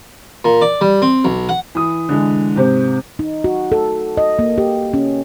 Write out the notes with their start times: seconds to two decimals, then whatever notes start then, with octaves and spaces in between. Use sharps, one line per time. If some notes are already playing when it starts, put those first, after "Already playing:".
0.44 A#2
0.62 D5
0.81 G3
1.02 C4
1.25 B1
1.49 F#5
1.75 E3 D#6
2.09 D3 E3 G#3
2.56 G#2 C3 C4
3.19 D#4
3.44 F#4
3.72 A4
4.17 D#5
4.39 A#3
4.58 G4
4.94 C#4